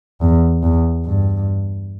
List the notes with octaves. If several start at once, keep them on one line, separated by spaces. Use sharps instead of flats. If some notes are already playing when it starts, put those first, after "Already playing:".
E2
E2
G2